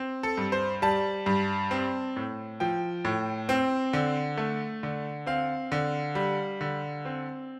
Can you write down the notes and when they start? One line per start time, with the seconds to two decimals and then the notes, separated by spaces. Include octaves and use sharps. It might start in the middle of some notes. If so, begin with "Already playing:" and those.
Already playing: C4
0.23 A4
0.37 G2
0.52 C5
0.82 G3 A5
1.26 G2
1.71 C4
2.16 A2
2.60 F3 G5
3.05 A2
3.49 C4
3.93 D3
4.37 A3
4.83 D3
5.26 C4 F5
5.72 D3
6.15 G3
6.61 D3
7.05 C4